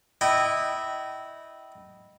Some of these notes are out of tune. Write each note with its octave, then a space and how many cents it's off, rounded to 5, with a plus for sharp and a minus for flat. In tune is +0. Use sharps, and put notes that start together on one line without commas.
E4 -15 D#5 -20 G5 -30